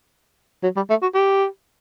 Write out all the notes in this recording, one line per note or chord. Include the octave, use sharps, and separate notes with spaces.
F#3
G3
A3
F#4
G4